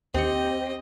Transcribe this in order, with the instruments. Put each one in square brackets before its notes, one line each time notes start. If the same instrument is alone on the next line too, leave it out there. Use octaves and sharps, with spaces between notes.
[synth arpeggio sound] D#2 C#7 [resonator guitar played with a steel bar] C4 [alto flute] G4 [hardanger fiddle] D#5